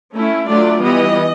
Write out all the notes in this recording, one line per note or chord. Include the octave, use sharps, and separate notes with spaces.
A3 C#4 E4
F#3 A3 D4 F4 D5
E3 G3 B3 D#5